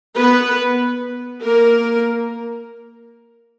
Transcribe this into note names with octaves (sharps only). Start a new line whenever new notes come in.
B3 B4
A#3 A#4